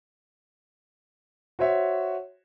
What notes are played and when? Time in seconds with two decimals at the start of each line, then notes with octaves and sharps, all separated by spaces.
1.59 F#4 C5 C#5 E5